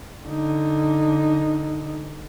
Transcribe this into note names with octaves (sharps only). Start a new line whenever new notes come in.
D3 D#4